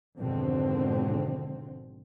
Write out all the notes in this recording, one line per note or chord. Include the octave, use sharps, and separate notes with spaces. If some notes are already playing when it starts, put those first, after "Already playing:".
G#1 F2 B2 D3 C4